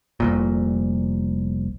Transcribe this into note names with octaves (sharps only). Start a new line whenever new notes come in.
F1 C2 A#2